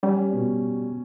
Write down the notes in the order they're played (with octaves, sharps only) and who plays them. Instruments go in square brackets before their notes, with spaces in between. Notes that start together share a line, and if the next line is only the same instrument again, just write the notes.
[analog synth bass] G3 [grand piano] C#4
[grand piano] B2